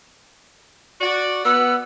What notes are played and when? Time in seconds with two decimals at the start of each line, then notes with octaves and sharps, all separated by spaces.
1.01 F#4 D5
1.45 B3 F#5 E6